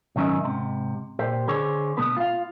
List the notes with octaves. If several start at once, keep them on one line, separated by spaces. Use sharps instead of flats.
B1 G#2 D#3 C#4 D#5 E5
G#2 C3
A#2 G4 C5
D3 G#4 C5 C#5
B2 A3 B3 B4
F4 F5